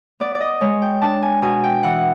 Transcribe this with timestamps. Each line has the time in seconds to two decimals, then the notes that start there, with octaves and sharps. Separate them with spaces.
0.20 B3 D5
0.35 D5
0.40 D#5
0.61 G#3 C#5
0.82 G5
1.01 D4 A5
1.22 G#5
1.42 B2 G#5
1.64 G5
1.83 E3 F#5